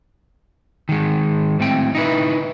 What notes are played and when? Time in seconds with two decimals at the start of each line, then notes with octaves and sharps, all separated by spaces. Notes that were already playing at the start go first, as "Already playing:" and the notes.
0.89 D#3 G#3
1.60 A2 C4 G5
1.95 D#4 E4 B4